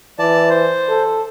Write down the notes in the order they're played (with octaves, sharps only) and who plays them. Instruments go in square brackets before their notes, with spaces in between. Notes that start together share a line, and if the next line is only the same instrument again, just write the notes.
[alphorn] E3 [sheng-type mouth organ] D5 A5
[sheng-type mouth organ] C5
[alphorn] A4